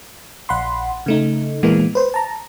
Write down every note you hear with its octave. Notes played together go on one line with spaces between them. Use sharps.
A#1 F#5 B5 C6
C#3 A3 D#4
A#2 E3 G#3 A#3 B3
B4 C5
A5 A#5